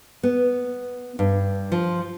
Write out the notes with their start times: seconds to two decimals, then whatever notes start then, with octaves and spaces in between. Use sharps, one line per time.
0.23 B3
1.19 G2
1.72 F3